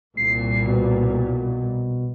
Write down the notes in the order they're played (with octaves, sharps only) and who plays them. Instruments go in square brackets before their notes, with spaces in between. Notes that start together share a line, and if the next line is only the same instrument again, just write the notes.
[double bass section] C2 A#2 [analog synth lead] C7
[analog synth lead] B2